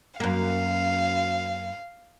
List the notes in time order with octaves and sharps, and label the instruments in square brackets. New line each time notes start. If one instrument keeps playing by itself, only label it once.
[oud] F#2 A#3 [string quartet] F5